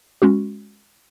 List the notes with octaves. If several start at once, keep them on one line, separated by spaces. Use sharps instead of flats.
G#3 C#4 F#4